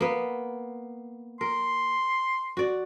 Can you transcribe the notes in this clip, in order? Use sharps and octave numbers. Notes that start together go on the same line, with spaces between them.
A#3 B3
A#4 C6
F#4 D5